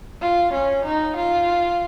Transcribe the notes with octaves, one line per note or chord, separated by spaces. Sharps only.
F4
C#4
D#4
F4